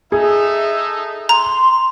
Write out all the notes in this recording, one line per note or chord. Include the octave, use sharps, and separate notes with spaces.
D#4 G#4 A4 E5
A#5 C6